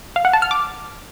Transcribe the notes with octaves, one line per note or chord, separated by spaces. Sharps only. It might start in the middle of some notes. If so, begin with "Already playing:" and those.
F5
F#5
A5
F6
D6